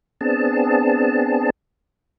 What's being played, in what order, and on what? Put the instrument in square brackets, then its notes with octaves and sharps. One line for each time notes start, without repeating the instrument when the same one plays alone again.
[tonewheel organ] B3 C4 D4 G#4 A5